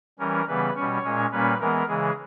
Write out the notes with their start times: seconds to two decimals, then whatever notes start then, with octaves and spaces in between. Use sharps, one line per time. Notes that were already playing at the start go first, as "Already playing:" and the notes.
0.19 E3 G3 C#4 A#4
0.48 C#3 E3 G3 B3 B4
0.75 B2 G3 C#4 C#5
1.03 A#2 G#3 C#4
1.32 A#2 G3 A#3 C#4 B4
1.60 E3 G#3 B3 A#4
1.88 C#3 E3 G#3 G#4